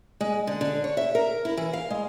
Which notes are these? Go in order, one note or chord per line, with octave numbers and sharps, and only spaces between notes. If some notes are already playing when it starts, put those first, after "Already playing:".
G#3
D3
D3
C#5
E5
A#4
E4
E3
F5
G#3